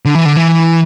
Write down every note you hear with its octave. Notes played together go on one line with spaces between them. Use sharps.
D3
E3
D3
E3